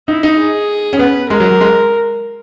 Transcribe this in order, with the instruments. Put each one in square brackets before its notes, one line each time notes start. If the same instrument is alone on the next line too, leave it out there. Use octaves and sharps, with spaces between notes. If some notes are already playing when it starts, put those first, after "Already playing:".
[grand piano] D#4 [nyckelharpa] E4
[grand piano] D#4
[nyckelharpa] G#4
[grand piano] C#4
[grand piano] B3 [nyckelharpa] B4
[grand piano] G#3 [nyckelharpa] A#4
[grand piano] F#3
F#3
G#3